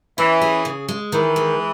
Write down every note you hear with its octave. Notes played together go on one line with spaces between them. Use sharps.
E3 C#4
G#4
C#3
G#3
D#3 E3
G#3